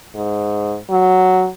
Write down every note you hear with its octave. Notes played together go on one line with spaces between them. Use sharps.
G#2
F#3